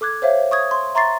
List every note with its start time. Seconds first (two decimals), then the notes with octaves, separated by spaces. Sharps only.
0.01 A4 D6 F#6 G#6
0.22 C5 C#5 E5 F5
0.51 C#6 D#6 G#6
0.71 C6
0.95 E5 A#5 C6 C#6 A6 C7